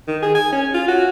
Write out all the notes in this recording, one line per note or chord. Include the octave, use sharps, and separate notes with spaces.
D#3
G#4
G#5
C#4
F4
F#4